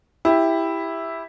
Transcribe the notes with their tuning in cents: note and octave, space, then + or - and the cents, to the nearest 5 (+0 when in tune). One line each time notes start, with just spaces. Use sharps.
E4 +0 G4 +10